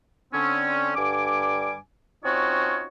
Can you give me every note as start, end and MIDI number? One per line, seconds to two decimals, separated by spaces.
0.33 0.92 50
0.33 0.92 60
0.33 0.92 61
0.95 1.74 43
0.95 1.74 50
0.95 1.74 55
0.95 1.74 80
0.95 1.74 86
2.23 2.85 60
2.23 2.85 61
2.23 2.85 63
2.23 2.85 65
2.23 2.85 66
2.23 2.85 73